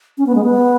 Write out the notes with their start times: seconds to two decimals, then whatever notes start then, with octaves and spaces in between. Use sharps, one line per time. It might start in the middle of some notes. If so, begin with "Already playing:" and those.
0.18 C#4
0.26 B3
0.35 G#3
0.44 B3